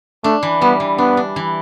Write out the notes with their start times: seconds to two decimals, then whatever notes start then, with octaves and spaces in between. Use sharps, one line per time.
0.24 A3 D4
0.43 E3
0.62 G3 B3
0.80 E3
0.98 B3 D4
1.17 D4
1.36 E3